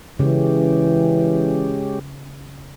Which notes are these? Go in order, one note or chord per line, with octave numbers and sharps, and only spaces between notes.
C#3 E3 G#3 C#4 G4